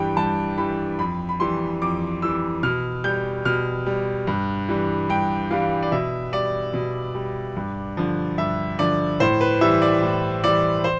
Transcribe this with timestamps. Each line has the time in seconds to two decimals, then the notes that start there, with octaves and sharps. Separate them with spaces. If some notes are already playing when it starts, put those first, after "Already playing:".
Already playing: G2 E3 G3 G5
0.17 G2 A5
0.58 E3 G3 B5
0.99 F2 B5
1.29 B5
1.40 E3 G3 C6
1.82 F2 D6
2.22 E3 G3 E6
2.63 B2 F6
3.04 G3 G6
3.45 B2 F6
3.86 G3
4.27 G2
4.69 E3 G3
5.09 G2 G5
5.51 E3 G3 F5
5.82 D5
5.92 B2 E5
6.32 G3 D5
6.74 B2
7.15 G3
7.56 G2
7.97 D3 F3
8.38 G2 E5
8.79 D3 F3 D5
9.20 A2 C5
9.41 B4
9.61 E3 G3 E5
9.82 D5
10.02 A2
10.44 E3 G3 D5
10.84 C5